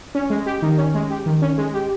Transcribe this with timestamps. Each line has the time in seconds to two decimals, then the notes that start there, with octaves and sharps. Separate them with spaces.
0.15 C#4
0.30 G#3
0.46 G4
0.62 D#3
0.78 C#4
0.94 G#3
1.10 G4
1.26 D#3
1.42 C#4
1.58 G#3
1.74 G4